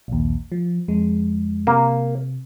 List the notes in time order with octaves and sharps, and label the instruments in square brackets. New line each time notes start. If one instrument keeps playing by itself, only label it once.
[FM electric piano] A#1 D#2
F3
F2 G#3
[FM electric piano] C3 [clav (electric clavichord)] A#3